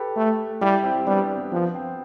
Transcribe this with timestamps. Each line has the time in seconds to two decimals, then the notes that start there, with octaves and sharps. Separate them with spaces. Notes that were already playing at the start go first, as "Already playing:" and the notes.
Already playing: G4 A4 B4
0.16 A3
0.61 G3 E4 G4
0.83 C4 E4
0.96 C4
1.07 G3 B3 D4
1.22 C4
1.37 B3
1.52 F3 B3
1.74 C4